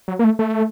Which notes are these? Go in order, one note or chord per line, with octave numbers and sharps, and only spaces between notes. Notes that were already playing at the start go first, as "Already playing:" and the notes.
F#3
A#3
A3
A3